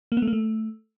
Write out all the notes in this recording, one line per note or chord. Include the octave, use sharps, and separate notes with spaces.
A#3
B3
A3
A#3
A3